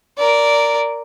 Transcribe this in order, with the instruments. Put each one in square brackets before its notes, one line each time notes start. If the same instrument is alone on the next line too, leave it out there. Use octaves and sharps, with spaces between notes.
[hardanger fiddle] A#4 D5